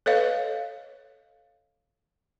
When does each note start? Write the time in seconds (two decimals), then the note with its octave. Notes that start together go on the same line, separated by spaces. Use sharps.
0.06 A4 B4 C#5 D#5 F5